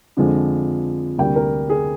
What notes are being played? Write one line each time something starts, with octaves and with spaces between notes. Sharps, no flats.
F2 D3 F3 G#3
D2 C3 G3 A#3 G5
A#4
G#4